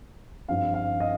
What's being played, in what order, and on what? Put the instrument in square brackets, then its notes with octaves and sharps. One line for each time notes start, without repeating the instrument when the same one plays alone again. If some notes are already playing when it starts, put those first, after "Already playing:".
[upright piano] G2 F3 C4 F5
F5
D#5